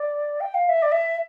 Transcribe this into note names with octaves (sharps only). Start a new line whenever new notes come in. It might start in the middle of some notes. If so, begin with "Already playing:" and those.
Already playing: D5
G5
F5
E5
D5
E5